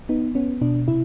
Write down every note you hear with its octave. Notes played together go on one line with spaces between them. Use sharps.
B3 D#4
B3 C#4
B2 D4
C3 E4